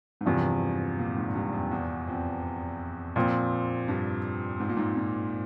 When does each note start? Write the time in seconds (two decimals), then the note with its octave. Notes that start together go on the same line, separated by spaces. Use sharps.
0.21 G#2
0.26 E2 G2 C3 F3
0.99 A#2
1.16 G#2
1.35 G2
1.53 F2
1.71 E2
2.08 F2
3.16 A#2 F3 C4
3.88 G2
4.60 G#2
4.69 A#2
4.77 G#2
4.97 A#2